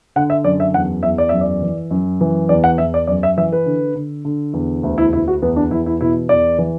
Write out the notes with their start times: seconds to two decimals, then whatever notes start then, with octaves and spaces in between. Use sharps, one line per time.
0.16 D3 F#5
0.30 E5
0.44 F#2 D5
0.60 E5
0.74 E2 F#5
1.03 E2 E5
1.18 D5
1.29 F#2 E5
1.41 D5
1.62 E3
1.91 F#2
2.21 E3
2.49 E2 D5
2.64 F#5
2.78 E2 E5
2.94 D5
3.07 F#2 D5
3.23 E5
3.37 E3 E5
3.52 B4
3.66 D3
3.95 D3
4.25 D3
4.54 E2
4.83 D2
4.98 E4
5.13 D2 E4
5.28 F#4
5.42 E2 B3
5.56 D4
5.71 E3 E4
5.86 E4
6.01 B2 E4
6.29 E2 D5
6.58 E3